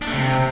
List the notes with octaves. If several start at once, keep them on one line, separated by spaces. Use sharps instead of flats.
D4
A3
C3